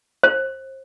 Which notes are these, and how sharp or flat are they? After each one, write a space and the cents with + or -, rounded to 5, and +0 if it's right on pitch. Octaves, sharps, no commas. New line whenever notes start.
C5 +30